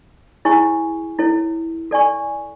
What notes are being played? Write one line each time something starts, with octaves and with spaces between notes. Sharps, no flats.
E4 G#4 C#5 G#5 C#6
E4 A4 C#5
A4 D5 G#5 C#6